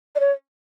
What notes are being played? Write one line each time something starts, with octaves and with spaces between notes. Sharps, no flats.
D5
C#5